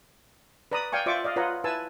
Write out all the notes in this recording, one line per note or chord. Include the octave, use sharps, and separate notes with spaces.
B4 D5 A#5 B5 D#6
D5 F5 G5 G#5 C#6
F4 C5 D5 E5 C#6 D6
D5 D#5 F5
F4 B4 C#5 D#5 F#5 A#5
E4 B4 G#5 A5 E6